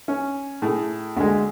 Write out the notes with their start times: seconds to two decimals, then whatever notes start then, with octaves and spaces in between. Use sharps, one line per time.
0.08 C#4
0.62 A2 G#4
1.16 D2 G#3